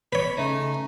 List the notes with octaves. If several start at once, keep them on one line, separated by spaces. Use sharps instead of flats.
B4 C#5 B5
C#3 A3 D#4